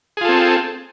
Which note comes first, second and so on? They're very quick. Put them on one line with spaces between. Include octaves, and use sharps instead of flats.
G#4 F4 A4 C4